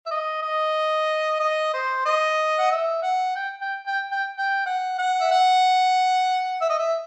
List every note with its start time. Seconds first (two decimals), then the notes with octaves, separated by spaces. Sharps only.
0.06 E5
0.11 D#5
0.42 D#5
1.40 D#5
1.73 C5
2.06 D#5
2.59 F#5
2.71 E5
3.03 F#5
3.36 G5
3.61 G5
3.87 G5
4.11 G5
4.37 G5
4.66 F#5
4.99 F#5
5.20 E5
5.31 F#5
6.61 E5
6.69 D#5
6.78 E5